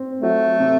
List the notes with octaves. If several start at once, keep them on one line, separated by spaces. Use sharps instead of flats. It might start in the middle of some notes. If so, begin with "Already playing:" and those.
Already playing: C4
F#3 A3
C3